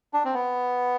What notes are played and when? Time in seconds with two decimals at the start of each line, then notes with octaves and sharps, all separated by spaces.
0.13 D4
0.25 C4
0.34 B3